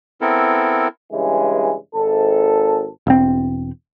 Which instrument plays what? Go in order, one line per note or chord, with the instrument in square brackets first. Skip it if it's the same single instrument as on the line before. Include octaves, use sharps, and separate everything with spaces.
[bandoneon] B3 C4 E4 A4 A#4
[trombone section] G2 C#3 E3 G#3
G#1 A4
[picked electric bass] E1 C4